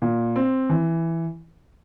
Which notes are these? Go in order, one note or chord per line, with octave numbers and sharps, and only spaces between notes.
A#2
C4
E3